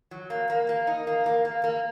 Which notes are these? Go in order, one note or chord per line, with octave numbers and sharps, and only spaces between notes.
F#3
A#3
A#3
A#3
D#4
A#3
A#3
A#3
A#3